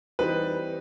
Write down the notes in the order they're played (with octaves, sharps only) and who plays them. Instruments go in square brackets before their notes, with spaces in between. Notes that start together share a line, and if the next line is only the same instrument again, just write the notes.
[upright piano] E3 G3 C4 D#4 [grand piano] B4